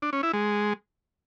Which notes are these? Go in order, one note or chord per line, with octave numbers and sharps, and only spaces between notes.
D4
C#4
E4
G#3